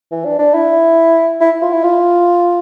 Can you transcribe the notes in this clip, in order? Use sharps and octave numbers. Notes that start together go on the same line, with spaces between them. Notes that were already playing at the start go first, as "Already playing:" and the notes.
E3
D4
D4
E4
E4
F4
E4
F4